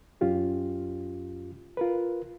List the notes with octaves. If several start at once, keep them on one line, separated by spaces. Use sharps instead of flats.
F#2 C#4 F4 G4
F4 A#4 B4